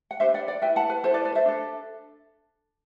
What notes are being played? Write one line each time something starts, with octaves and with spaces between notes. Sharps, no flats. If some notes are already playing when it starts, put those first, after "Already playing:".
F#5
D4 G4 B4 C5 E5
D5 F#5
D5 F#5
E4 B4 E5 G5
F#5 A5
B4
E4 A4 C5
B4 D5
B4 D5
C5 E5
D4 A4